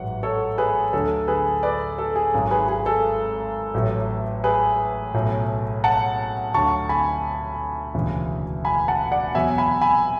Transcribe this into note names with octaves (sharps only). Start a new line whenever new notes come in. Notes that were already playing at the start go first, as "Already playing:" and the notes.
Already playing: A1 G#2 F#3 F#5
A4 C#5
G#4 B4
D2 D3 F#3 A4
G#4 B4
B4 D5
A4
G#4
G#1 G#2 F#3
G#4 B4
G#4
A4
A1 A2 F#3
G#4 B4
B1 A2 F#3
F#5 A5
D2 D3 F#3 A5 C#6
G#5 B5
E1 D2 C#3 E3
G#5 B5
F#5 A5
D5 F#5
E2 B2 F#3 E5 G#5
G#5 B5
G#5 B5